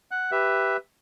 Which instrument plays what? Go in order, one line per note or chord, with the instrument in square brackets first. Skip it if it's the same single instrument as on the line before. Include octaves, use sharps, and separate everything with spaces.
[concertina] F#5 F#6
G4 B4 E5